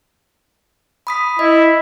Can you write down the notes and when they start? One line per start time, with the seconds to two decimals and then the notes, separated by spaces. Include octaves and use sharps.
1.07 B5 D#6 B6
1.39 E4 D#5